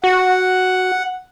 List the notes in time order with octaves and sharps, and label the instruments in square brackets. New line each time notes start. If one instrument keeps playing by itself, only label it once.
[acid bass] F#4 [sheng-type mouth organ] F#5